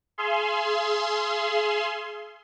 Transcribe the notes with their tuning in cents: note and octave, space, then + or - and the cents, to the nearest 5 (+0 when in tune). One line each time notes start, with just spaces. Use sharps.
G#4 +25 F5 -40 C6 +0